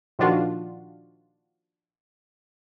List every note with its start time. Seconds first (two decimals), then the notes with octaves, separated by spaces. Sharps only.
0.19 A#2 D#3 F3 D4 F4 F#4